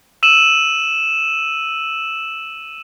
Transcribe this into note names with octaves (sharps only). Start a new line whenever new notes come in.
E6 D#7 E7 F#7